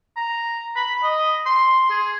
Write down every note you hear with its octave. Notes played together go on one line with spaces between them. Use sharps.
A#5
B5
D#5
C6
G#4